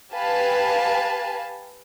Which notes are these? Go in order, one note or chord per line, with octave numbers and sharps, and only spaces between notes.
G4 B4 F5 G#5 A5